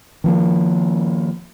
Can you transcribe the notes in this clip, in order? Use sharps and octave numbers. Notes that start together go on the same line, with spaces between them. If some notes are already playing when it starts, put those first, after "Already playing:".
D#3 F3 A#3